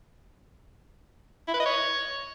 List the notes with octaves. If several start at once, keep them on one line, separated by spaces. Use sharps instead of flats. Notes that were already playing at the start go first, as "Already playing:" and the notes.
E4
B4
D#5
C#5